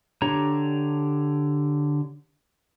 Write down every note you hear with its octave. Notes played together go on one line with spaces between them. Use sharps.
D3 D4 G4 C#5 A#5